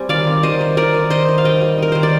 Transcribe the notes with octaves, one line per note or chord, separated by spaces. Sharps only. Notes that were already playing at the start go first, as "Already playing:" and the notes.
Already playing: G3 C4 G#5
D#3 D5 F5
C4
D#3 C5 D#5
D#3
D#3 A#4 D5
D#3
D#4 C5 D#5
D#3
F5
G3 D#5 G5
G3
D#4 A#4
D#3 C5
D5